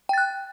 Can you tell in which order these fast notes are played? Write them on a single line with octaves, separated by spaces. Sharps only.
G5 A6 F#6